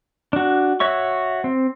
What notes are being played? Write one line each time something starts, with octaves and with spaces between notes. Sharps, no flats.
D4 F#4
F#4 C#5 E5 C#6
C4